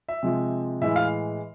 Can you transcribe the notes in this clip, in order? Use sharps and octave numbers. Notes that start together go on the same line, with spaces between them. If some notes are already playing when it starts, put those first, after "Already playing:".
E5
C3 F3 G#3
A2 E3 G#3 E5
F5